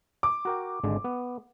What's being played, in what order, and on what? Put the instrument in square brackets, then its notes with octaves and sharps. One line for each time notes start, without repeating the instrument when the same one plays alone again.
[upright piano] D6
[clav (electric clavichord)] F#4 A#4 G5
G#1 D3 G#3
B3